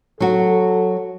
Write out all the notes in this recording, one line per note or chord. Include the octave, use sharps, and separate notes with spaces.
F#3 F#4 A4